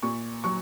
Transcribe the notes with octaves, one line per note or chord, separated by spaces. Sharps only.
A#2 C#6
F#3 C#6